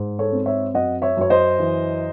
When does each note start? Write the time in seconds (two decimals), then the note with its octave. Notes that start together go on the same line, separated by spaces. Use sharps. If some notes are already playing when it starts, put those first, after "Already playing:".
Already playing: G#2
0.19 A4 C#5
0.32 C4
0.46 C#5 E5
0.74 F#2 D#5 F#5
1.02 C#5 E5
1.17 F#2 C#5
1.30 C5 D#5
1.59 E3